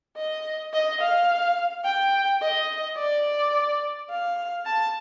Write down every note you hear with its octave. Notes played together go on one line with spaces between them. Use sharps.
D#5
D#5
F5
G5
D#5
D5
F5
A5